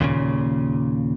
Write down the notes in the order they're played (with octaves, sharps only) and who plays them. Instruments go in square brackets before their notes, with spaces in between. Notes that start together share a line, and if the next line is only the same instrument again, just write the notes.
[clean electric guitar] D#2 A#2 C#3